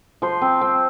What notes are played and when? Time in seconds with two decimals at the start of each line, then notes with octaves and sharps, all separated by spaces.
0.22 F3 C5
0.42 C4
0.61 C4